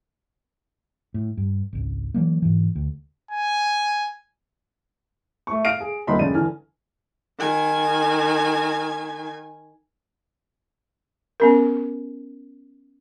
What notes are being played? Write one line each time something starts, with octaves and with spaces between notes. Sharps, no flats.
A2
G2
G#1 C#2
E3 F#3 A#3
G#2 E3
D2
G#5
A3 C#6
F5 F6 A#6 C7 D7 D#7
G#4
D#1 C#2 A#3 D#5 B5 C6
F1 C#3 G#3 D5 D#7
E2 D3 G#5 F6
D#3 G#5
B3 C#4 A#4